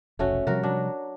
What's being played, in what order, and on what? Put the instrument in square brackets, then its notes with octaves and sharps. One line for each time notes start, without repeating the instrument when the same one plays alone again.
[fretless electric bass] F1 B1 [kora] A3 C#4 F#4
[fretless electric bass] C3 F3 G3 [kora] F#4 A#4
[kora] F#3 D4